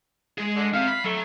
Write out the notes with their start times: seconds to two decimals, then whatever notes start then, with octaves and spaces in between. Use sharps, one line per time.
0.38 G#3 G#4
0.55 D3
0.74 C4 E5 F5
0.88 B5
1.04 F#3 A3